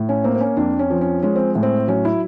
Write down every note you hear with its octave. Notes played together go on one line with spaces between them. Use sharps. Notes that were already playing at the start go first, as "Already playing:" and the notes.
Already playing: A2
C#4
A#3 C4
C4
C#4
F2 D4
C#4
F3
C#4
G#3 C#4
C4
A2
C4
F#3 C#4
E4